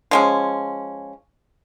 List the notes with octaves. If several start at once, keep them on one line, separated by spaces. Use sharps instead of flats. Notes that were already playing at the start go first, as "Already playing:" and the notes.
F3 G#3 C#4